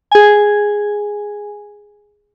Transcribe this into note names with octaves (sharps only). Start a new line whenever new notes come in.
G#4 G#5